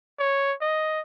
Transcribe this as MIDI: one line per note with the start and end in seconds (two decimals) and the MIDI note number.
0.19 0.54 73
0.61 1.00 75